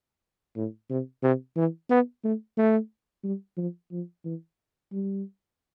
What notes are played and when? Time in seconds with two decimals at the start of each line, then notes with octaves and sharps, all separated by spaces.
0.56 A2
0.90 C3
1.23 C3
1.56 E3
1.90 B3
2.24 A3
2.57 A3
3.24 G3
3.57 F3
3.92 F3
4.25 E3
4.92 G3